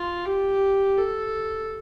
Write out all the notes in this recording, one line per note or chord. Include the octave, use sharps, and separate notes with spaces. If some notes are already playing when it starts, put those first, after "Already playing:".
Already playing: F4
G4
A4